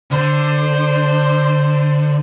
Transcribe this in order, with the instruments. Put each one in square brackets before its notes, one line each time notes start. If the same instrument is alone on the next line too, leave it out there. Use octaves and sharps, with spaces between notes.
[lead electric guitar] D3 [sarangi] C5